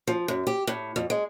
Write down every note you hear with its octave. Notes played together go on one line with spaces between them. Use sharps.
F3
F#2
G4
A2
F2
G#3